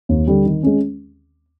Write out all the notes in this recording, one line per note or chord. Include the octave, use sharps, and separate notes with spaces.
D#2
D3 G3
D#3
G#3 C#4